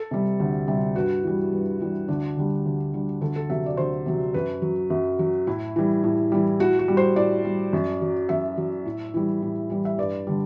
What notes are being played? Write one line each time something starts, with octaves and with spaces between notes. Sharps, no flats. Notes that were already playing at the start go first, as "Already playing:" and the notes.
Already playing: A4
C3 G3
D2
C3 G3
G2 F#4
E3 G3
G2
E3 G3
D2 D4
D3 G3
D2
D3 G3
D2 A4
A4
C3 F#3 E5
D5
D2 C5
C3 F#3
F#2 B4
F#3
F#2
F#3
A2 E4
E3 G3
A2
E3 G3
A2 F#4
F#4
G3
C5
A2 D5
G3
F#2
F#3
F#2 E5
F#3
A2
E3 G3
A2
E3 G3
E5
G2 D5
D3 G3